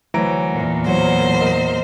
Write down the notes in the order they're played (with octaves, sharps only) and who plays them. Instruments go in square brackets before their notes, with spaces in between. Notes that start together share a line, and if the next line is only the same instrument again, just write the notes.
[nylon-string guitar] D2 F#3 C5 [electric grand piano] E3 A#5 D7
[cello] E2 A#2
[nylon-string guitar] F#3 E4 F#4 [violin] C5
[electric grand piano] A#4 D#5